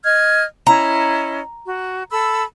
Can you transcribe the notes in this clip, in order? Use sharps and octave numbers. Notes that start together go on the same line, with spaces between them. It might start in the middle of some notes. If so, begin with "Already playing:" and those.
D#5 F6 G#6
C#4 E4 D#5 A#5
F#4
A4 B5 E6